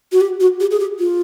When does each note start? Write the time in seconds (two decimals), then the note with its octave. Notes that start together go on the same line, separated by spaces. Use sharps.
0.12 F#4
0.21 G4
0.40 F#4
0.60 G4
0.71 G#4
0.79 G4
0.99 F4